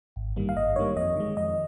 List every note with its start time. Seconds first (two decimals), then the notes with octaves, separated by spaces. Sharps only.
0.16 G#1
0.36 G2 D#3 G3 A#3
0.49 F5
0.56 G#1 D#5
0.76 G2 D#3 G3 A#3 C#5
0.96 F2 D#5
1.16 D#3 G#3
1.37 F2 D#5